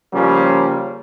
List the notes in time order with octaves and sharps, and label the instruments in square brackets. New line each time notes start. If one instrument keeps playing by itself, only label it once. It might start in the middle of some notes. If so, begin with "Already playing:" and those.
[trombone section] C#3 F3 G3 A#3 C#4